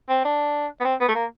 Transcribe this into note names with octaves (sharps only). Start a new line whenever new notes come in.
C4
D4
B3
C4
B3
A3
A#3